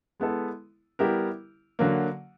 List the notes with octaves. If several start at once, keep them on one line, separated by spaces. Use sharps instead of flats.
G#3 B3 E4 A4
G3 B3 E4 G4 A#4
D3 F#3 A#3